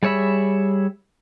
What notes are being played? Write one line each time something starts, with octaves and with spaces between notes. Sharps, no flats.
G3 G#4 C#5 E5 B5